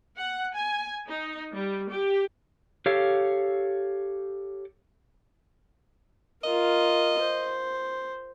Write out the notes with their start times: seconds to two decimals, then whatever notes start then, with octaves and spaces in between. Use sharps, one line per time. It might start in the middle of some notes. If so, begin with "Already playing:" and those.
0.17 F#5
0.54 G#5
1.07 D#4
1.53 G3
1.90 G4
2.86 G4 A4 C#5 F5
6.44 F4 A#4 D#5
7.22 C5